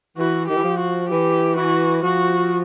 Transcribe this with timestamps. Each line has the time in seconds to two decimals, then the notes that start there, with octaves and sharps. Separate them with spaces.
0.17 E3 F#4
0.48 D#3 G4
0.56 E3
0.63 F3
0.79 F#4
1.09 E3 G4
1.56 E3 F#4
2.02 F3 F#4